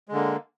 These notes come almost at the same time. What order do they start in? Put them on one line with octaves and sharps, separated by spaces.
G#3 D3 A#3